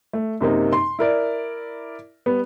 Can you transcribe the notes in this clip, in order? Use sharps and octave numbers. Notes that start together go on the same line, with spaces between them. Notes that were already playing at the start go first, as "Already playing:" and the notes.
A3
F#2 C3 A#3 D#4
C6
E4 A#4 D5
G3 B3